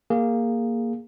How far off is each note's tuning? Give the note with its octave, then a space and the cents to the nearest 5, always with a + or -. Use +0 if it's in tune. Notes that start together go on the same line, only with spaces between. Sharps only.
A#3 +0 G#4 -10